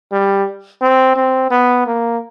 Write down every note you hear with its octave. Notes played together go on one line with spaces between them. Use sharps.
G3
C4
C4
B3
A#3